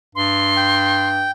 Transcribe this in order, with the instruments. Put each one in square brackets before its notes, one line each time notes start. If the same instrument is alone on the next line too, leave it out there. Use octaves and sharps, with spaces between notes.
[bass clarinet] G2 [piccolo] C6
[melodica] G5